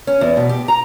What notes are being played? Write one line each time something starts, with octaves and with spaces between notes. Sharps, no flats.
C#4
E2
B2
G4
A#5